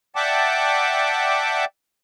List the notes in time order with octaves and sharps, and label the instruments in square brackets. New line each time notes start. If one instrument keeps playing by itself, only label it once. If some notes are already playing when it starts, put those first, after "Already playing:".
[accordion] D5 E5 F#5 G5 A5 D6